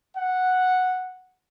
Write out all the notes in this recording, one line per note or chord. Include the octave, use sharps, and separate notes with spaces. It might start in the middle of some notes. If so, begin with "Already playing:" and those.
F#5